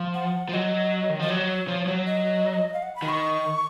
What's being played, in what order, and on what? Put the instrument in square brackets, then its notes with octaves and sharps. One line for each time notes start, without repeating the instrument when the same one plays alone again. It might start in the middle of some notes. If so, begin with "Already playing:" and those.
Already playing: [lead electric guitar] F3
[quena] F#5
[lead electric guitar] F3
[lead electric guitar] F#3 [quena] D#5
[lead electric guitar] D#3
[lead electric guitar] F3 [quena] D#5
[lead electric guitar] F#3 [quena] C#5
[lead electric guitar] F3
F#3
[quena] D#5
F5
F#5
B5
[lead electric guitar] D#3
[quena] C#6